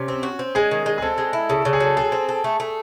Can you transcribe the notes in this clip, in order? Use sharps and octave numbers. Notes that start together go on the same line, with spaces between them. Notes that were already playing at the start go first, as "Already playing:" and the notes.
Already playing: C3 C#4
C4
F#4
C4
G#3 G#4
D#3
G#3
G#4
C4 A4
G#3
E4
C#3 A4
C#3 A4
G#4
F#3 A4
G#4 A4
C4
A4
A3
A3